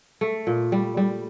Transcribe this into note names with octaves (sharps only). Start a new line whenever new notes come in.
A3
A#2
G3
G3